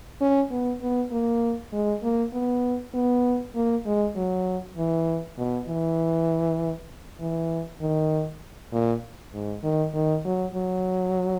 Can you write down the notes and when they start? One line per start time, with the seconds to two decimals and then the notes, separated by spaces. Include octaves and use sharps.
0.21 C#4
0.51 B3
0.81 B3
1.12 A#3
1.72 G#3
2.03 A#3
2.33 B3
2.94 B3
3.55 A#3
3.86 G#3
4.16 F#3
4.77 E3
5.38 B2
5.68 E3
7.20 E3
7.81 D#3
8.72 A#2
9.33 G#2
9.63 D#3
9.94 D#3
10.25 F#3
10.55 F#3